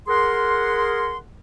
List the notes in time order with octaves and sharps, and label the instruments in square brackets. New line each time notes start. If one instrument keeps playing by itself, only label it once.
[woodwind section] G#4 A#4 F#5 C6